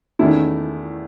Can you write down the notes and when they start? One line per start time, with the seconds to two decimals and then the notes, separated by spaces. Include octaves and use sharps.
0.19 E2 D#3 A3 C#4 E4